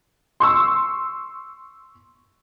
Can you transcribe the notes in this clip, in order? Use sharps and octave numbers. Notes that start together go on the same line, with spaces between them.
C6 C#6 E6